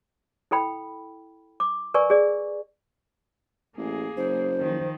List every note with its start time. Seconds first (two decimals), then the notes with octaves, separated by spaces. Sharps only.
0.51 E4 A4 G5 B5
1.60 D6
1.94 A#4 B4 D5 G#5 C#6
2.10 G#4 D5
3.77 A1 A#3 G#4
4.17 F#1 C5
4.60 D#3 F3